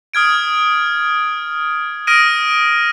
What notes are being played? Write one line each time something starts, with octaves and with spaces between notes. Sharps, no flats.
D#6 F6 G#6 D7
D#6 F6 A#6 D7 D#7